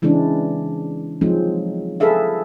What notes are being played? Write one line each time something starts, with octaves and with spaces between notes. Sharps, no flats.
C#3 E3 G#3 C4 D4
F3 F#3 G#3 C4 D#4
G#4 A4 B4 E5 F5